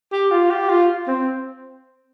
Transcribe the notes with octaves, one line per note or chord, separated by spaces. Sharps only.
G4
F4
G4
F4
C4